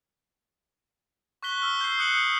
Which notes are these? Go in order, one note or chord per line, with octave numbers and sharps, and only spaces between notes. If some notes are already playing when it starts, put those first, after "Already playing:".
C#6 F#6 B6 G7
E6 F6
G6 C7
D#6 F#6 C#7 F#7